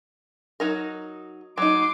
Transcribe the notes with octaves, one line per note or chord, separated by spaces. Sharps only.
F#3 D#4 A#4
F#3 D#4 C6 D6